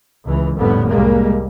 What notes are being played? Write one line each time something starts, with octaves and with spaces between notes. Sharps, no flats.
C#2 E3
F1 A#1 A2 D3 G3 B3
C2 G3 G#3 A#3